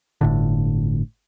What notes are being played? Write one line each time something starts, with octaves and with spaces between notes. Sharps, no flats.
G1 A2 D3